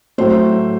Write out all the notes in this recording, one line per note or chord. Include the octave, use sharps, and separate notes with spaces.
A2 F#3 A3 C5